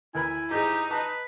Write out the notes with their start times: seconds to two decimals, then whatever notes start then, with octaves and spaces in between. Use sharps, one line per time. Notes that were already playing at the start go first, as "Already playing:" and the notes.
0.15 D2 E4 A#4 G#5 B5
0.51 G#2 D#4 G4 G#4
0.91 B4 A5 D6